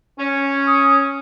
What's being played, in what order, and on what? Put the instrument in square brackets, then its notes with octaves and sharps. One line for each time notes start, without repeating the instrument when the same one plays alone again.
[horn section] C#4
[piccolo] D#6